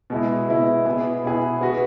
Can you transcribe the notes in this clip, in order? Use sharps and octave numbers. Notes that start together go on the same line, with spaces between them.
B2 G#3 E4
B2 G#3 E4
B2 B3 E4 G#4
B2 B3 E4 G#4
B3 F#4 B4